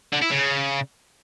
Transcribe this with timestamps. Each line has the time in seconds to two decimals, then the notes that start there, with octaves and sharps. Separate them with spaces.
0.13 D3
0.22 E4
0.31 C#3